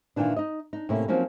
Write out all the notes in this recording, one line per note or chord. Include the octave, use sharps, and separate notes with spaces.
A#2 D#3 E3 D4
D#4 D#5
D4 D#4
A2 C3 A#3 C#4 E4
F3 F#3 A#3 C4 C#4 D#4